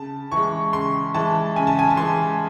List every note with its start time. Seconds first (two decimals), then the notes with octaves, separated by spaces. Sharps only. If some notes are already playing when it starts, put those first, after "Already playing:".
Already playing: C#3 A5
0.32 E3 G#3 C#6
0.73 C#3 C6
1.14 E3 G#3 A5
1.56 C#3 G#5
1.67 A5
1.79 G#5
1.90 A5
1.97 E3 G#3 C6